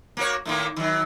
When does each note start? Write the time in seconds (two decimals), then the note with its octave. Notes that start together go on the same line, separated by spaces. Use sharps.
0.17 A#3 F#4 C#5
0.45 A2 D#3 A#3
0.76 D#3 F#3